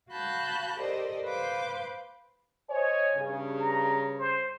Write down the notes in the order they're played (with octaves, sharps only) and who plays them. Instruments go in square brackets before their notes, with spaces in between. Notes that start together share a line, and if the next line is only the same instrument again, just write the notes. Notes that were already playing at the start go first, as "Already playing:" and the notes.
[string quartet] F#4 F5 A5 B5 F#6 G6
G4 A4 A#4 C5 D5 D#5
B4 C5 F5 C6 D6 G6
[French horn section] C5 C#5 D#5 [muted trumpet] G#5
[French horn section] G2 C#3
[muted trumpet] A#5
C5